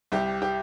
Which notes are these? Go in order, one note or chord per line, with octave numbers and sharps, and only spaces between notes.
C2 G4
G4